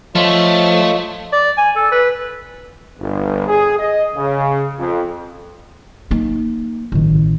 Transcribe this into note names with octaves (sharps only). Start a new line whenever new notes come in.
F3 A3 F4 C#5 D#5
D5
G#5
A4
B4
G1
G#4
D#5
C#3
F2
A#3 D#4
A1 D#3